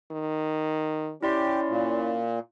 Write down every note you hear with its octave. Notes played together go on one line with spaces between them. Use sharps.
D#3
C#4 E4 G4 D5 C6
A#2